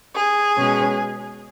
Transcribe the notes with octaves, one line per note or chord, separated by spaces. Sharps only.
G#4
B2 G#3 C#4